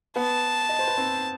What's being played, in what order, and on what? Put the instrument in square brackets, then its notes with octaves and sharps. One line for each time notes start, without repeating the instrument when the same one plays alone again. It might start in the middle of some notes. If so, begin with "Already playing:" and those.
[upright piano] B3 B4 [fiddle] A5
[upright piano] D#5
C5
B4
C4 C5